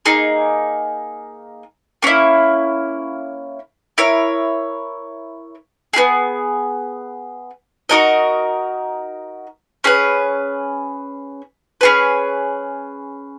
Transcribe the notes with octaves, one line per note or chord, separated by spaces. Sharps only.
A#3 D#4 G#4
A#3 C#4 E4
E4 A#4 C#5
B3 E4 G#4
D#4 F#4 A#4 D#5
C#4 G#4 B4
C#4 G#4 B4